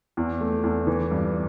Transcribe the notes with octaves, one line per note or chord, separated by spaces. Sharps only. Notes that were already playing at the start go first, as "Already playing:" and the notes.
E2
A3
E2
E3
G2